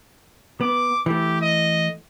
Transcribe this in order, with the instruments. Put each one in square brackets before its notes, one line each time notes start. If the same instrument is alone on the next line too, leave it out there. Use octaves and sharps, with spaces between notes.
[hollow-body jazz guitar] B3 [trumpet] D6
[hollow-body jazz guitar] E3 A3 [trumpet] G4
[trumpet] D#5